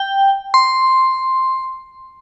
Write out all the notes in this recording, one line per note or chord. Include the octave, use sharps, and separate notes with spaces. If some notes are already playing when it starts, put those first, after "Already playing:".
Already playing: G5
C6